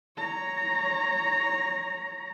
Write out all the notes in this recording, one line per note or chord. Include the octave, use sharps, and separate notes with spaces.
C#5 A#5